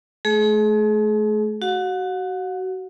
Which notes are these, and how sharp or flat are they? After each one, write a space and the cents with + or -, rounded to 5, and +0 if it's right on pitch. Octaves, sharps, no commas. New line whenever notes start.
A3 -35 G#4 +35
F#4 +25 F#5 -40